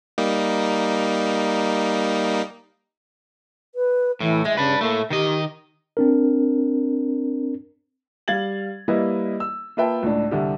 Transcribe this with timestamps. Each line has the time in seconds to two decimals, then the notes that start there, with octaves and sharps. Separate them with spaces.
0.18 G3 A#3 D#4
3.75 B4
4.20 A2 E3
4.45 G#3 E5
4.57 C#3 D4 B4
4.81 A2 A3 A#3
5.10 D#3 G4 D#5
5.97 C4 D4 A#4
8.28 G3 F5 G#6 A6 F#7
8.88 G3 A#3 E4 B4 D#5
9.40 E6
9.77 A#3 F4 B4 E5 G5 A5
10.02 C#2 A2 D4
10.31 C2 D3 G4